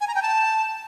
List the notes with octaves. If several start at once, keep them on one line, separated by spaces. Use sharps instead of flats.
G#5
A#5
G5
A5